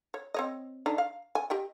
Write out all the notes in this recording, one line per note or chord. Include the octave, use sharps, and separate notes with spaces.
C#5
C4 C#5 D#5
D3 D4 D#4
F5
G#5
G4 D#5 G5